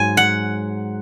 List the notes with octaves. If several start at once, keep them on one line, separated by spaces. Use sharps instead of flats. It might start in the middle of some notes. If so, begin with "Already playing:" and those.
Already playing: G#2 F#3 G#5
F#5